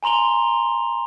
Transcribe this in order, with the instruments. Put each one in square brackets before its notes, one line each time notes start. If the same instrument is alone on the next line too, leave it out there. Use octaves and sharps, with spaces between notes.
[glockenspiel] G#5 A#5 C6 F7 G7